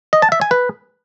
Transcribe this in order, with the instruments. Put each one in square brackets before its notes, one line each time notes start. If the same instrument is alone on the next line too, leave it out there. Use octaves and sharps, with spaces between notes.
[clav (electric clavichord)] D#5
A5
E5
G#5
B4